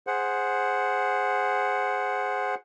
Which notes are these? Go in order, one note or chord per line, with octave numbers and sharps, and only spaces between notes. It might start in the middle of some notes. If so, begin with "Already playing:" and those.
G#4 C5 F#5